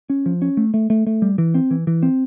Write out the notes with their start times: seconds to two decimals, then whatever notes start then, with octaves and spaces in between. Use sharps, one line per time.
0.10 C#4
0.26 F3
0.42 C#4
0.57 A3
0.74 A3
0.90 A3
1.07 A3
1.22 G3
1.38 E3
1.54 C4
1.71 E3
1.87 E3
2.03 C4